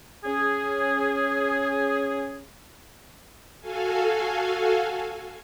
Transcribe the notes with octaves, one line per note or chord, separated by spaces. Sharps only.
C#4 G#4
F#4 A4 F5 G#5